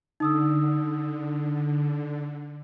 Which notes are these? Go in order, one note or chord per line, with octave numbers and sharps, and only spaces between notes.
D3 D#4 D#6 E6